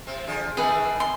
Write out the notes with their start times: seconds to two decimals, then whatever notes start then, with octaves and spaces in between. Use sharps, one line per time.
0.07 C3 C4
0.27 D3 F3 G#4
0.57 D#3 A3 A#3 G#4 B4
1.00 C6